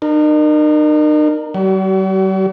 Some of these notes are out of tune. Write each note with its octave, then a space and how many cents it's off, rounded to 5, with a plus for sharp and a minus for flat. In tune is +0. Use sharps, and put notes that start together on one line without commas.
D#4 -45 A#4 +0
G3 -45 F#4 +40